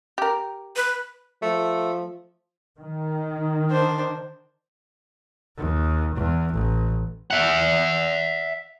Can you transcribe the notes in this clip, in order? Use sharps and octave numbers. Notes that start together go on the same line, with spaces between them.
G4 A#4
B4
F3 A3
D#3
D4 C5
D#2
E2
A1
E5 F#5